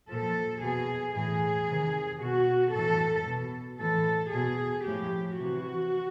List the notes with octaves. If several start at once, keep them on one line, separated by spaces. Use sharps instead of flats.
A#2 F3 A4
B2 G#4
A2 E3 G#4
C3 D#3
B2 F#4
A2 E3 A4
B2
A2 E3 A4
B2 G#4
A2 F3 G4
C3 E3 F#4